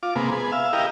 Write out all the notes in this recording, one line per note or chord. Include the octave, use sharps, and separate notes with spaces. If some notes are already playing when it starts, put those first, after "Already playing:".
F4 D6
C3 G#3 A#3 B3
B3 G#4
E5 F5
E4 G4 A#4 D#5 F5